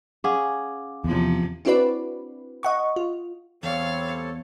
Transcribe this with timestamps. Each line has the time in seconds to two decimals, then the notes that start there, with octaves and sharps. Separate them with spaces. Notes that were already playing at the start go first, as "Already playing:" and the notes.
0.24 C#4 G#4 F5 F#5 D6
1.04 E2 C3 F3
1.65 C4 D4 E4 F#4 B4 D5
2.63 D#5 F#5 C#6
2.96 F4
3.63 E2 G3 C4 A4 C#5 F5